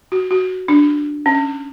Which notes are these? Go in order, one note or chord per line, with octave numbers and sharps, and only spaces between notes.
F#4
F#4
D4
C#4